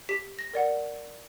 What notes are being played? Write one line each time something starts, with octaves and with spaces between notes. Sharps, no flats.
G4 B6
A#6
A#4 D5 F#5